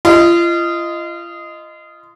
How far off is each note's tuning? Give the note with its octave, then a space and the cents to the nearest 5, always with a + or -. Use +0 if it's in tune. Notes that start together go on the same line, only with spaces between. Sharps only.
F4 -35 D#5 +0